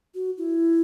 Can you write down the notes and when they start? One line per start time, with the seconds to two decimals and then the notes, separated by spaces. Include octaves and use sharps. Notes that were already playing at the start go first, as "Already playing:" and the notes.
0.15 F#4
0.38 E4